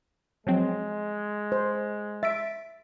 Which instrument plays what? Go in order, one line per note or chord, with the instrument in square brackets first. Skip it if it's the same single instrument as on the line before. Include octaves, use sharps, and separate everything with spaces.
[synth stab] F3 F#3 C4 [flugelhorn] G#3
[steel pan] C5
[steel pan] E5 [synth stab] A6 B6 D7